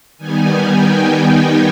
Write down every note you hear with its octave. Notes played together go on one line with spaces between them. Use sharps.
D#3 G3 B3 D#4 G#5
G5
G#5